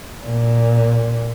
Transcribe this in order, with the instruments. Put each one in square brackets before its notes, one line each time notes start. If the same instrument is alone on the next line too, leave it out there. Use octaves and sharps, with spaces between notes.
[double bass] A#2